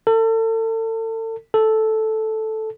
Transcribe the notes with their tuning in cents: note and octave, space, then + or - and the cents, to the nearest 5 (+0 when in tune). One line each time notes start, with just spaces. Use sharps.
A4 +35
A4 -5